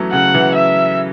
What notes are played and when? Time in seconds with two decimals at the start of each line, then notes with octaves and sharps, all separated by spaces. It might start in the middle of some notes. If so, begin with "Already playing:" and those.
Already playing: E3 F#3 A3 B3 C#4
0.12 C#3 F#5
0.34 E3
0.55 E5